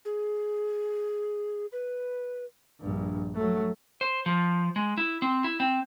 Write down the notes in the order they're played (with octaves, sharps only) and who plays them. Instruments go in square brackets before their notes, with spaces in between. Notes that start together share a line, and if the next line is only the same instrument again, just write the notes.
[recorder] G#4
B4
[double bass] A#1 G2
F#3 A3
[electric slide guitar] C5
F3
G#3
E4
C4
E4
C4